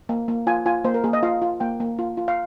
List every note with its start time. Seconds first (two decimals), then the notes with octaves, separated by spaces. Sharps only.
0.09 A#3
0.28 A#3
0.47 F4 G#5
0.66 F4 G#5
0.84 A#3 C5
0.94 A#4
1.04 A#3 G#4
1.13 D#5
1.23 F4 F5
1.42 F4
1.60 A#3 G5
1.80 A#3
1.99 F4
2.17 F4
2.28 F5